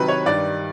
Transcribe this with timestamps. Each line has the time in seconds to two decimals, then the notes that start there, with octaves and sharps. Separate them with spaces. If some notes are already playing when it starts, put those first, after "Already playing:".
Already playing: C3 D#3 F#3 B4
0.08 C#5
0.26 G2 D#3 G3 D5